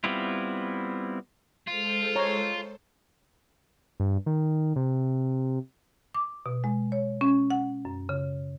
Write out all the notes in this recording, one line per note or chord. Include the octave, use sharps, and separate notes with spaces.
G3 B3 C4 E4 F4
G#3 F4 A4 C5
C#5 A#5
G2
D#3
C3
D6
B2
G#3
C#5
C#4
F#5
F#2
C#3